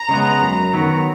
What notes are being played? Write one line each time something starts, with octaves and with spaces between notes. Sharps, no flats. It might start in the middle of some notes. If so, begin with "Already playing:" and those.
Already playing: A#5
C#3 G#3 B3
F#2
D#3 F#3 B3